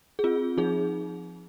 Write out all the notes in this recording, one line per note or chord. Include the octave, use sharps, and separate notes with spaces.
G#4
C4 F4
F3 D#4 G#4